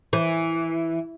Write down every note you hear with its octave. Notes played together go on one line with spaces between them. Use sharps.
E3